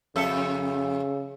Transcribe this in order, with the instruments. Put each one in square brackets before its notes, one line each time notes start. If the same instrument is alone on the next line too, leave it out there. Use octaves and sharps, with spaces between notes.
[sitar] F2 A4 E5 [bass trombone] C#3